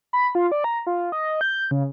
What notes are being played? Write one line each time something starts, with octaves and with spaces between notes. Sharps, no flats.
B5
F4
D5
A#5
F4
D#5
G6
C#3